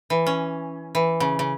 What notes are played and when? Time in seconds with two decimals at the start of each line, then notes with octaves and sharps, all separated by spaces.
0.10 E3
0.26 C#4
0.95 E3
1.20 C#3
1.39 C#3